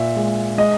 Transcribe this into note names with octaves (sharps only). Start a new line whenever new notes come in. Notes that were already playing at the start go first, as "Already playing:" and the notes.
Already playing: A#2 E5
G#3
G#3 D#5